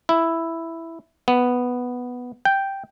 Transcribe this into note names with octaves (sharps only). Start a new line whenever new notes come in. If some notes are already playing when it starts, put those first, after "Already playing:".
E4
B3
G5